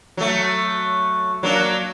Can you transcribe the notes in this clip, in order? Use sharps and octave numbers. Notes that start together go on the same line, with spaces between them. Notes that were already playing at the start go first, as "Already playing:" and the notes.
F#3 A3
F#3 A#3 D4